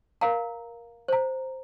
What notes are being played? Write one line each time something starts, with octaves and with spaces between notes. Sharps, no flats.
A#4 F5 A#5
C5 A#5